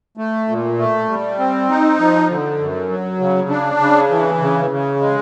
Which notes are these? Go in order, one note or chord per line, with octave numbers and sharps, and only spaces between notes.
A3
A#2
A3
G3
C4
D#4
F3
D3
F#2
F#3
C#3
D4
C#3
E3
C#3
C#3
G#3